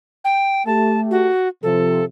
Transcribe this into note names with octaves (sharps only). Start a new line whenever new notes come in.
G5
A3 G4 A5
F#4
C3 F3 A4